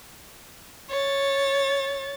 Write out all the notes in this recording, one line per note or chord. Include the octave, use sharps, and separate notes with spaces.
C#5 A6